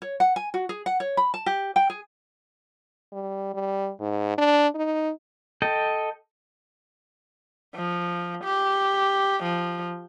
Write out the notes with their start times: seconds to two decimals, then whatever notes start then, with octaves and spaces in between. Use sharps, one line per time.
0.02 C#5
0.20 F#5
0.36 G#5
0.54 F#4
0.69 G#4
0.86 F#5
1.00 C#5
1.17 B5
1.34 A5
1.46 G4
1.76 G5
1.90 G#4
3.13 G3
3.54 G3
4.00 G#2
4.38 D4
4.75 D#4
5.62 A4 D#5 G5
7.75 F3
8.44 G4
9.43 F3